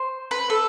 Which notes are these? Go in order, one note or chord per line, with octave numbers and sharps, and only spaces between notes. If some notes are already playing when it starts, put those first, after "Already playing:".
Already playing: C5
B4
A4